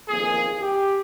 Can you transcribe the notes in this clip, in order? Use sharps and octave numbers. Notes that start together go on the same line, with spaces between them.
G1 F2 D#3 A#3 G#4
G4